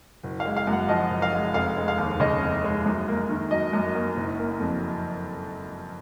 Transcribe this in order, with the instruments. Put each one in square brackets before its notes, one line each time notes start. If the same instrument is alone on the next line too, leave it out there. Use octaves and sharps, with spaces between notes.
[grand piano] F#1
F5
G#3
F5
F#2
F#5
F3 D#5
F#1
F5
G#3
F1 F5
G#3
F5
D#2
C#3 D#5
F1
G#3
F#2
A#3
D#3
F#3 D#5
F#2
A#3
F#1
A#3
F2